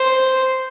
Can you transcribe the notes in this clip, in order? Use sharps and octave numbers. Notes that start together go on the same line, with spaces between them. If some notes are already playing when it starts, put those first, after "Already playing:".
Already playing: C5